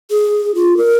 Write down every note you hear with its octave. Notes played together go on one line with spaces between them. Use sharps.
G#4
F4
A#4